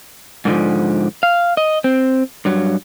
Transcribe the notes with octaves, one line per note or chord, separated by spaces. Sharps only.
G#2 D3 D#3 F3
F5
D#5
C4
G2 F#3